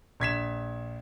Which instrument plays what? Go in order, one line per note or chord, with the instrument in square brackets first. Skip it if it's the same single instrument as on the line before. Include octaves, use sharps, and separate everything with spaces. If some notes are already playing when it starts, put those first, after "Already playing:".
[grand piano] A#1 G#6 B6 E7